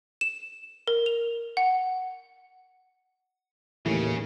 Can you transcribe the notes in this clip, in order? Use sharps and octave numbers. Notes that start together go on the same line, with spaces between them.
E7
A#4
F7
F#5
D#2 A2 C#3 E3